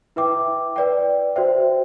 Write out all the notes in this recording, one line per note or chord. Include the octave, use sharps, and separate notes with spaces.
E4 B4 E5 G5 D6
B4 D5 G5
F#4 C5 E5 G5